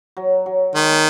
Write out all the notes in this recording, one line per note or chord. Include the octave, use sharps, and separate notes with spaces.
F#3
F#3
D#3 G#3
A#3